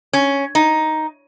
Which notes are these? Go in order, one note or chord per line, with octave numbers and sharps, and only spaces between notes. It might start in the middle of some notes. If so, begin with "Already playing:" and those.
C#4
D#4